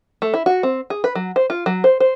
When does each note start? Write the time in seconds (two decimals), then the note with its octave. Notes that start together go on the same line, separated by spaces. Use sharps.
0.22 A3
0.34 E4
0.46 F#4
0.63 C4
0.90 G#4
1.04 B4
1.15 F#3
1.36 C5
1.50 F4
1.66 F#3
1.84 C5
2.00 C5